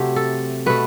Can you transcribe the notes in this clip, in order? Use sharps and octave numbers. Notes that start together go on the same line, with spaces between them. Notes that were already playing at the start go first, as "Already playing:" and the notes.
Already playing: C3 F#3 A3 G4
A4
B2 A3 B4